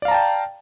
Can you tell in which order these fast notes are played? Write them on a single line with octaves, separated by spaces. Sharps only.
D5 F5 A#5 A5 G5